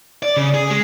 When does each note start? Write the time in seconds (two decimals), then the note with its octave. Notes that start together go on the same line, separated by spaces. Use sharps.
0.23 D5
0.37 C#3
0.54 G#4
0.71 G#3